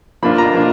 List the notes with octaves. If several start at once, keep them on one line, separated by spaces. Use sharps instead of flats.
F3 A#3 D4 F4 B5
A#5
F3 A#3 D4 F4